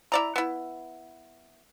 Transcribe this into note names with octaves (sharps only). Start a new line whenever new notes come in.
E4 D5 A#5
B3 E4